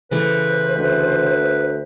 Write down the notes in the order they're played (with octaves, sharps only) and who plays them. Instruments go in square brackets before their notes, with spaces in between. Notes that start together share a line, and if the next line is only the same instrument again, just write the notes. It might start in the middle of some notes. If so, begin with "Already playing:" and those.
[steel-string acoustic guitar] C#3 E3 A3 [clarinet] B4 [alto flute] C5
[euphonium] D2 [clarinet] B4